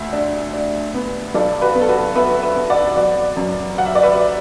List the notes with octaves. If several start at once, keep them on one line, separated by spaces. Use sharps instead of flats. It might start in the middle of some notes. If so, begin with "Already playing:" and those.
Already playing: D2 E5
D4
D4
B3
B1 A4 D5
F#4 B4
B3
A4
F#4 B4
B3 B4 E5
B4 E5
B3
D5 F#5
F#3 D5 F#5
F#2
F#3 F#5
E5
D5
B4 E5